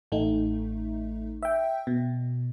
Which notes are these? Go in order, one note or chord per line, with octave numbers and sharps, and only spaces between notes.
A1 A3 D#4
E5 G5
B2